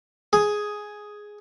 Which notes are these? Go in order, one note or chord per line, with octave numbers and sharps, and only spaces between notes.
G#4